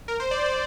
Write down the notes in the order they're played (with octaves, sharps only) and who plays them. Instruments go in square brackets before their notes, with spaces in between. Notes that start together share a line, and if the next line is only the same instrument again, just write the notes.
[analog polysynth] A#4
C5
D5
D5